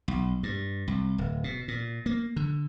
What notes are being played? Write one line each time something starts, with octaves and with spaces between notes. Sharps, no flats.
B1
G2
C2
D1
B2
A#2
A#3
D3